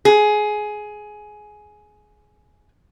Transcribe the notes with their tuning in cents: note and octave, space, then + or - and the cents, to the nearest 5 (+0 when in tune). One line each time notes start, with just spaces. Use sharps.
G#4 +15